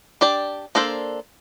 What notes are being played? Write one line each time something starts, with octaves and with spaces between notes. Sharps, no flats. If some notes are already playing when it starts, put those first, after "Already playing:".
D4 G4 D5
A#3 D4 A4 C5